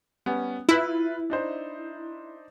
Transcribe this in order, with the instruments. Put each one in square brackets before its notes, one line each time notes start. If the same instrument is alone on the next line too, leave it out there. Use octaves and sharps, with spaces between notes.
[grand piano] G3 B3 C#4
[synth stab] E4 [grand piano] F4 B4
[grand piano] D4 D#4 C5